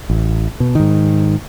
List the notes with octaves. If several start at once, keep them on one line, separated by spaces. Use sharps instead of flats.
A1
B2
G#2 D#3